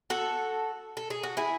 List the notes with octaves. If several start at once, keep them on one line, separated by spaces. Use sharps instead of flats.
F#4 A4
A4
G#4
F#4
E4 G#4